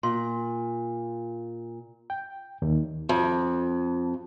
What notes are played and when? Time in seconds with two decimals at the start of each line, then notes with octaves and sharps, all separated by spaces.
0.03 A#2 C6
2.10 G5
2.62 D#2
3.09 F2